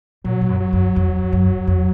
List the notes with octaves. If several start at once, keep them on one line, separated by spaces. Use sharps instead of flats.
A#2 F#3
G#2
F#2
F#3
F#2
F2
F#2
F2